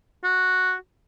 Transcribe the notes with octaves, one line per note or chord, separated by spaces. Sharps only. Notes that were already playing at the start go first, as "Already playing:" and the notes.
F#4